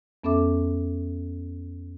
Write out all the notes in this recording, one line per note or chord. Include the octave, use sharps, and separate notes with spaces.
F2 B3 C#4 A4 E5 D6